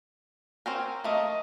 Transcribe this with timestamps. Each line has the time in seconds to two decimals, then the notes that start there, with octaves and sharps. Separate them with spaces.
0.66 C4 C#4 A#4
1.04 A3 A#3 D#5